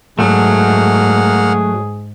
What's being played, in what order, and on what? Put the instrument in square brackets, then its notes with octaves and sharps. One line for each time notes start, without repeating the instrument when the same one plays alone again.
[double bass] G#2 [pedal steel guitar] F#3 A3 [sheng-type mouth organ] A#3 F#5 F6 [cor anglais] G#4